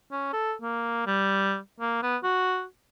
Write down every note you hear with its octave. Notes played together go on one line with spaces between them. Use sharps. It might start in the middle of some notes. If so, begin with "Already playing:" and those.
C#4
A4
A#3
G3
A#3
B3
F#4